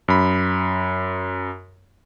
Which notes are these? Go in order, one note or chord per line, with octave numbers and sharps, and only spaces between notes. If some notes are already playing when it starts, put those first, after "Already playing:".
F#2 B5